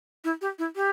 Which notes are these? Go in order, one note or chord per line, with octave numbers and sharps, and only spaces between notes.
E4
G4
E4
G4